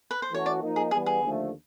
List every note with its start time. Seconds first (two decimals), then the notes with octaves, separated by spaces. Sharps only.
0.11 B4
0.22 C5
0.30 E3 A3 C#4 F#4 A4 C#5
0.46 D5
0.61 F3 A#3 D#4
0.76 G#4
0.91 E3 G3 B3 G#4
1.06 G#4
1.21 D#2 D3 F3 A3